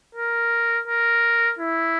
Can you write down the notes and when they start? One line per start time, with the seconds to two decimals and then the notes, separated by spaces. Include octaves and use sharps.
0.15 A#4
0.88 A#4
1.59 E4